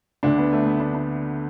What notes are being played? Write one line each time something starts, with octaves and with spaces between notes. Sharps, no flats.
D2 D3 D4
B3
A3
B3
D4
D4